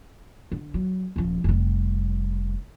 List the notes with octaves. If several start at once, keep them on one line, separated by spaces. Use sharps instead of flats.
D3
F#3
D#1 F3
F1 G3